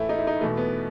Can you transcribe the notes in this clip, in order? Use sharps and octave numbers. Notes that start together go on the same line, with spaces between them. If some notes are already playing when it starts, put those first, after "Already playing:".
Already playing: A2 E3 A3 E4
D#4
E4
D#4
E2 B2 A3
B3